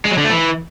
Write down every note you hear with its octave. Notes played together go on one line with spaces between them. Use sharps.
G#3
F#3
D3
A3
E3